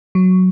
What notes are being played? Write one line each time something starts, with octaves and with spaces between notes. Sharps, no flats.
F#3